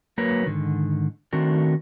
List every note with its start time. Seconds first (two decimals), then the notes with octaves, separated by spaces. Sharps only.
0.18 F#3 A#3 A#4 B4 C#5
0.46 G#2 D3 D#3
1.33 D#3 A3 C4 D4 F#4 A#4